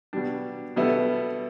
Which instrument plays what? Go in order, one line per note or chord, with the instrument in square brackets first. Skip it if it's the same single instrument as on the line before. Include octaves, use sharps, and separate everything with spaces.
[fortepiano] B2 G3 D4
B2 G3 B3 E4 A4